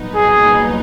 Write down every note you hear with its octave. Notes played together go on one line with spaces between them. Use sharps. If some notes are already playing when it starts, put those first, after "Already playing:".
Already playing: C2 A#2 F#3 B3 D#4
G#4